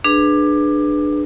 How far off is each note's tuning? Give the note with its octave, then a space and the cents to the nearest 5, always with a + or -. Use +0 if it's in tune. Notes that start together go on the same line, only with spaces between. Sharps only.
D4 +20 G#4 +0 B4 +0